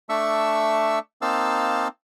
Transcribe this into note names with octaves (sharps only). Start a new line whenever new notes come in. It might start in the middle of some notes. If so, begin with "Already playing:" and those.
A3 D4 E5 C#6 E6
A#3 C4 D#4 F5 A5 E6